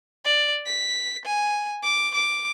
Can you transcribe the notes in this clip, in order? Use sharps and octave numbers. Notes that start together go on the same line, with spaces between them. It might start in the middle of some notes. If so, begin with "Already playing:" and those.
D5
B6
G#5
D6
D6